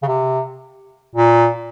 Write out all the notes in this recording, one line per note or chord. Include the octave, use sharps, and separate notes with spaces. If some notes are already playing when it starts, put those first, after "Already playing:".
C#3
C3
A#2